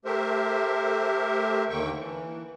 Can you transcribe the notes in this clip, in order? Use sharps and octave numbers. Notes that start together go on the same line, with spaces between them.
A3 G4 A#4 C5 E5
D#2 D3 D#3 A#3 G5 C#6
E3